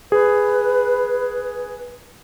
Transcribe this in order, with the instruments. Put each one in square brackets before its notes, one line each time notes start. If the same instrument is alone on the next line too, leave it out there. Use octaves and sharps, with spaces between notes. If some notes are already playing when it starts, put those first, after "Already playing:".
[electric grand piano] G#4 [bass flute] B4